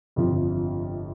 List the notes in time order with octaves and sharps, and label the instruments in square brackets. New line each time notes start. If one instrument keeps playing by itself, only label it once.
[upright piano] G1 F2 C3 F3